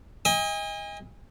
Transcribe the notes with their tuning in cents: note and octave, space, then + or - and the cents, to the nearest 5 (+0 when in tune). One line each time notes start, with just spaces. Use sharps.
D#5 +25 G#5 -35